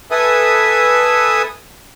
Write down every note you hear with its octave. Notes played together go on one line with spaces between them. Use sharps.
A4 B4 E5 G#5 D#6